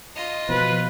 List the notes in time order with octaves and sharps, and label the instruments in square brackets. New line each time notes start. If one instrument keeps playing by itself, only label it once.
[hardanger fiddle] F4 D#5
[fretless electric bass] B2 F3 [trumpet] B4